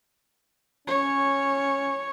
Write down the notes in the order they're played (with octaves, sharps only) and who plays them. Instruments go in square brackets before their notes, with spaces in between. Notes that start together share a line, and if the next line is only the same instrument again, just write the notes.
[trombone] C#4 [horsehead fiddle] C#5